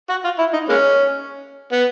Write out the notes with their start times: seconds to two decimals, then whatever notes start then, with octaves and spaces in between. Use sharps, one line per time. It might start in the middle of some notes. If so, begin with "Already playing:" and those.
0.10 F#4
0.25 F4
0.39 E4
0.53 D#4
0.69 G#3 A#3 C#4
1.72 B3